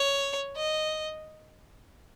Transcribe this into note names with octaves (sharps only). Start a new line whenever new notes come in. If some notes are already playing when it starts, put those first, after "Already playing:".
Already playing: C#5
D#5